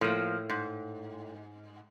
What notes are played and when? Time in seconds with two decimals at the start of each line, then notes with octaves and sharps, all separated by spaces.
0.01 A2 F3 A#3
0.50 G#2